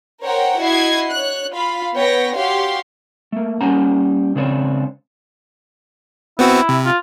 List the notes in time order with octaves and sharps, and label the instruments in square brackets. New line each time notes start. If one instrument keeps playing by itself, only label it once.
[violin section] A#4 C5 C#5 F#5 G5 A#5
E4 F#4 D#5 G#6 C7
C#5 F#6
F4 F5 B5
B3 B4 C#5 G5 A#6
F#4 G4 C#5 F5 C6
[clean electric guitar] A3 A#3
G3 A#3 C#4 F#5 A#5
C#2 C#3 C4 D4 F#4 C#5
[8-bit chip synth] B3 C4 F#4 [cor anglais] E4
[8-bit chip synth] C3
[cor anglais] F4